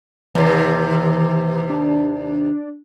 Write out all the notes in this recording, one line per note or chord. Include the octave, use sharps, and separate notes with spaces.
D#2 C3 E3
D4